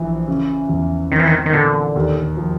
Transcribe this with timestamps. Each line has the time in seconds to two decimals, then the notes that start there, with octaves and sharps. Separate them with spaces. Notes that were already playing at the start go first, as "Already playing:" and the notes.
Already playing: A#1 E3
0.28 C#3
0.69 E2
1.12 D#3 C4
1.19 E3
1.27 D#3
1.46 D#3
1.53 A#2 D3
1.96 D#2
2.37 F3